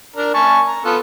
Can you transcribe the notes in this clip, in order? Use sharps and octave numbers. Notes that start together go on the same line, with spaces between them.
D4 A#4 A#5
G#5 A5 C#6
A#5
B3 F4 A4